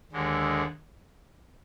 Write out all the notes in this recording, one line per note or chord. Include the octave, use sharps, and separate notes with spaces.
D#2 D3 G#3